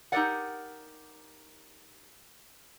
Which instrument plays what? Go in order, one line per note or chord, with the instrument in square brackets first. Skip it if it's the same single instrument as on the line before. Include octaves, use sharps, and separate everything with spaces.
[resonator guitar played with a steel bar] D#4 G4 A4 A#4 D5 F#5